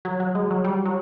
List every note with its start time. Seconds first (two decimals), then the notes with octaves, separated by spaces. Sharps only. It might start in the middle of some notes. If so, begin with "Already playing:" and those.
0.05 F#3
0.20 F#3
0.35 G#3
0.50 F#3
0.64 G3
0.85 F#3